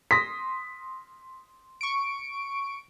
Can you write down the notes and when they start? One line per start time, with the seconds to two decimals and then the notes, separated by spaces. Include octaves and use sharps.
0.11 C6 D#6 A#6 B6
1.81 C#6 D7